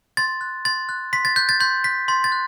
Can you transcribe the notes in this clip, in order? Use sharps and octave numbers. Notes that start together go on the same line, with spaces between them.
C6 A6
F#6
C6 A6
F#6
C6 B6
A6
F#6 G6
A6
C6 G6
F#6 B6
C6 A6
A6
F#6